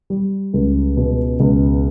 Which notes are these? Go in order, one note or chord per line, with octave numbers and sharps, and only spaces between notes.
G3
C#2
B2
C#2